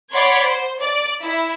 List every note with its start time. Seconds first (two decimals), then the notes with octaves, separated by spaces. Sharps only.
0.13 C#5 D5 F#5 B5 C6 G#6
0.45 C5
0.79 D5
1.23 E4